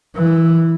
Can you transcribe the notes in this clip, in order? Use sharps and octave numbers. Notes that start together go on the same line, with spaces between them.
E3